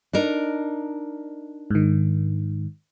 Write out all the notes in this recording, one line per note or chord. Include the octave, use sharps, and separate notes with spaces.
D4 D#4 A#4
G#2 D#3